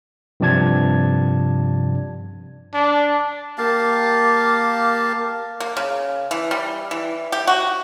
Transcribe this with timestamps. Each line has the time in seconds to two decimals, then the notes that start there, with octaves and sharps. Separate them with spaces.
0.40 G2 C3 F3 D5 A5 G#6
2.74 D4
3.58 A#3 G4 F5 A5
5.60 A#3
5.77 C#3
6.31 E3
6.51 G3
6.91 E3
7.32 G4
7.47 F#4